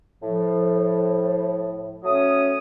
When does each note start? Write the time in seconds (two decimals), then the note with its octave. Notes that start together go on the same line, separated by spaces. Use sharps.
0.22 A2 F3
2.03 F#3 A3 C#4 D#6